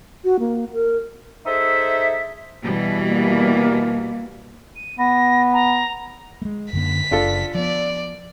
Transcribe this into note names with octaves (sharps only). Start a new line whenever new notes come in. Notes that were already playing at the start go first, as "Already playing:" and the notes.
F#4
A#3
A#4
D#4 G#4 A4 C5 E5
B2 E3 G3
A#3
D#7
B3 A#6
A#5
G#3 A3
F#2 D3 A#3 B6
F#1 D4 F4 A4
F3 B3 D5